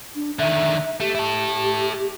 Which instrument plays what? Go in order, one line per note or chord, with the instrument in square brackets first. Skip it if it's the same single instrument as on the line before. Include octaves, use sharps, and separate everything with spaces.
[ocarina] D4
[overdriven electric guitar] D3 D#3 [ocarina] E5
[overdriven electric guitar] A3 [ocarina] G4
[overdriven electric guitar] E4 A4